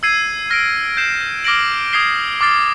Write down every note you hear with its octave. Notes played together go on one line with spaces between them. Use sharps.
E6 G#6 C7 D#7
F6 A#6 D7
G6 C7 E7
D6 F6 A#6 D7 F#7
D#6 G#6 C7 E7 G7
D6 F6 A6 C7